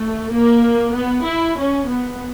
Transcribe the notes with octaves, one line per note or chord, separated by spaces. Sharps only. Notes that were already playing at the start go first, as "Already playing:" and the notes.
Already playing: A3
A#3
B3
E4
C#4
B3